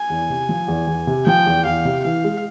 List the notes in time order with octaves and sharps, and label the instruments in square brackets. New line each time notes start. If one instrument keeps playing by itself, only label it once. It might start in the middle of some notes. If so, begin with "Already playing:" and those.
Already playing: [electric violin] G#5
[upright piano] E2
C3
F3
E2
E2
C3
[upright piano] F3 [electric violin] G5
[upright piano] E2
[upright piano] E2 [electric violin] F5
[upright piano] C3
[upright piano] E3 [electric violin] F5
[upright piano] G#3